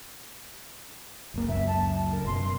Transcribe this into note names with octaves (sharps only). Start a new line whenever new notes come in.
F#1 C#2 A#3
F#1 C#2 F#2 E5
A5
A#4
F#2 B2 C6